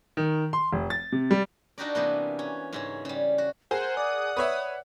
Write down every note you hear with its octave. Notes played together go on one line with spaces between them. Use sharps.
D#3
C6
F1
A6
C3
G3
D4 D#4 F#4 G4 A#4 D5
C3 E3 A#3 B3
C#4
G#2 C#3 C#4
C#3 G3
F#4
G#4 A#4 C5 F#5
D5 D#6
B4 C#5 E5